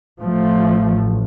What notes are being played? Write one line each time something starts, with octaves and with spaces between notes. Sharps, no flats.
A1 A2 F3 A3